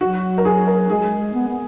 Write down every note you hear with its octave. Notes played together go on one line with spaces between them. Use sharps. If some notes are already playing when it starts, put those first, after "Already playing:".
F#3 F#4
A#4
G#4
A#4
G#3 G#4
B3
B3